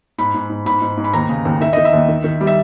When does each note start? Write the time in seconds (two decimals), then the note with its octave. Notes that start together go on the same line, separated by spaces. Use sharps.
0.18 G#2 B5
0.34 G#2
0.50 G#2
0.66 G#2 B5
0.82 G#2
0.97 G#2
1.04 B5
1.13 D#2 A#5
1.29 C#3
1.45 D#2
1.61 D#3 E5
1.73 D#3 D#5
1.85 E5
1.93 D#2
2.08 D#3
2.24 D#3
2.41 G3
2.47 E5